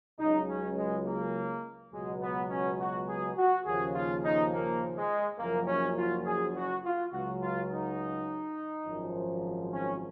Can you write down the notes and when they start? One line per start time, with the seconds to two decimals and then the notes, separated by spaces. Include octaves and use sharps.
0.19 C#2 C#3 F#3 D#4
0.48 C#4
0.77 G#3
1.05 A#3
1.92 C#2 B2 F#3 G#3
2.21 B3
2.50 C#4
2.80 F#4
3.09 G#4
3.37 F#4
3.66 D#2 C#3 F3 G#4
3.95 F4
4.24 D#4
4.53 A#3
4.96 G#3
5.39 F#1 F#2 F3 A#3
5.68 C#4
5.97 F4
6.25 G#4
6.56 F#4
6.84 F4
7.12 C#2 C#3 F#3 F#4
7.42 F4
7.70 D#4
8.86 G#1 F#2 F3
9.73 C#4